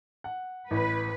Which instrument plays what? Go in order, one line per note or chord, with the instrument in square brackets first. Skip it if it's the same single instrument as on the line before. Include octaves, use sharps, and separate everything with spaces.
[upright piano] F#5
[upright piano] A1 [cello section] B4